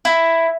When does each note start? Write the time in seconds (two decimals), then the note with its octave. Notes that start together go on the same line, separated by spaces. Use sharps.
0.05 E4